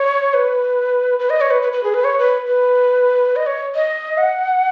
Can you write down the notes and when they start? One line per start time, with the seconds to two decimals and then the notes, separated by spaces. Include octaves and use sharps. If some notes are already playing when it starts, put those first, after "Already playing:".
Already playing: C#5
0.34 B4
1.19 B4
1.30 D#5
1.41 C#5
1.51 B4
1.62 B4
1.73 B4
1.84 G#4
1.94 B4
2.04 C#5
2.19 B4
2.47 B4
3.36 D#5
3.46 C#5
3.75 D#5
4.18 F#5